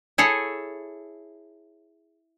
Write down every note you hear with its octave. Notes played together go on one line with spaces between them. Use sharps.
E4 G#4 A4 C#5